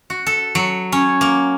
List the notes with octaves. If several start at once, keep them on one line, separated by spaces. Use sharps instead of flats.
F#4
A4
F#3
C#4
A#3